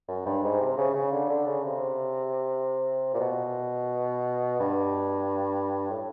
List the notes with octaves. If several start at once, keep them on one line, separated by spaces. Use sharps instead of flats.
F#2
G2
G#2
C3
C#3
C#3
D3
D3
C#3
C3
A#2
B2
G2
A2